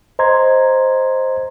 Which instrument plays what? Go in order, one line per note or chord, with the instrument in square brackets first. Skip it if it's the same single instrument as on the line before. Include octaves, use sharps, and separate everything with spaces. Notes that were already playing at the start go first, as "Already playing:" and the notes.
[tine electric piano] C5 D#5 A#5 C6 G#6